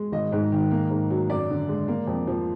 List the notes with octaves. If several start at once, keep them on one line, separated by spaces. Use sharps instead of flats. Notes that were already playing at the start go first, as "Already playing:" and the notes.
Already playing: G#3
G#1 D#5
G#2
D#3
A#3
G#2
F#3
F#2 D5
D3
G#3
A#3
F2
F3